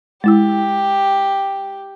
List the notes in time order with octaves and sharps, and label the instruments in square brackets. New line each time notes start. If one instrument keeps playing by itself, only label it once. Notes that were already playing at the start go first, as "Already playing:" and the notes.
[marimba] G#3 E4 E6 [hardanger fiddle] G4